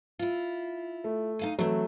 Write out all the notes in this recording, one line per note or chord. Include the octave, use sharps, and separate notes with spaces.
E4 F4
A3
D#4 F5 G#5
E3 F#3 A3 C4